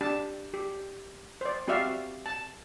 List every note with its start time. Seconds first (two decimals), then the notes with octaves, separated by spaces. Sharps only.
0.01 D4 G4 A5
0.54 G4
1.41 C5 D5
1.68 C4 F#4 G4 D5 E5 F5
2.26 A5